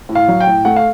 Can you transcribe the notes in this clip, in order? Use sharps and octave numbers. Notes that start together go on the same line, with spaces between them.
A2
F5
F#3
G5
A2
A3 F#5
F5